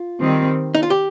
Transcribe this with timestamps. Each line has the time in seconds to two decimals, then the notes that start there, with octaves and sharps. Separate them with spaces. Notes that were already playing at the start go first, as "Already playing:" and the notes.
Already playing: F4
0.22 D#3 G3 C4
0.75 D#4
0.83 F4
0.90 G4